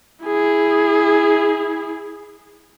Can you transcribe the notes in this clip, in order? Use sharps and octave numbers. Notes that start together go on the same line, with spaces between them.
E4 G#4